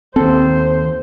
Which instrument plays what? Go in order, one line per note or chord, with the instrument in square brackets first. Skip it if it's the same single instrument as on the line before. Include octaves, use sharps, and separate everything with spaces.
[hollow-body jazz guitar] D#2 A4 [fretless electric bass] C4 [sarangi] C5